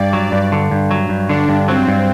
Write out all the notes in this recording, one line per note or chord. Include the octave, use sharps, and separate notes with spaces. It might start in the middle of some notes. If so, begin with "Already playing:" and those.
Already playing: G2 D5
F#3
G2
D3
G2
F#3
G2
D3 D4
G2
F#3 C4
G2